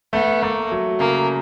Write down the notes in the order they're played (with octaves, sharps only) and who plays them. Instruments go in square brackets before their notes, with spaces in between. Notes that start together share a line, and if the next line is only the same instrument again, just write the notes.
[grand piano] A3 [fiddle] B3
[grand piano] A3 [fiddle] A#3
[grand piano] F#3
[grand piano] C#3 [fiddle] A#3